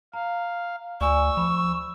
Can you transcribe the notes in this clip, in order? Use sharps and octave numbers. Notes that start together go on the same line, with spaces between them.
F5 A#5
D2 D5 G#5 C#6 E6
F3 B5